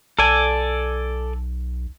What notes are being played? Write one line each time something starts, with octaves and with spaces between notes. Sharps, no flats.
B1 A4 D5 G#5